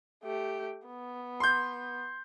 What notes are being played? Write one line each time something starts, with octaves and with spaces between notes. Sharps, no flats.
A3 G4
B3
C6 G6